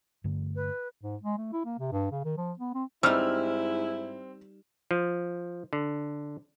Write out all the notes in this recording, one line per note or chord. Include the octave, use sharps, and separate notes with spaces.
G2 D3 A3
B4
G#2
G#3
A3
E4
A#3
C3
G2
C#3
D#3
F3
B3
C4
G#2 G3 C4 D#4 E4 E6 F6
F3
D3